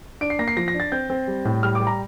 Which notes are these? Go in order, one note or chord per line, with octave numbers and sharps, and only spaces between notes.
D4 D7
C7
A#3 A#6
C7
F3 A#6
A#6
D4
A6
C4 G6
C4
G3
A2
G3 F6
D6
G3
A#5